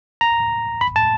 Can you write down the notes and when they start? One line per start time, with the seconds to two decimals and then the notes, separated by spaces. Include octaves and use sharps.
0.21 A#5
0.81 B5
0.96 A5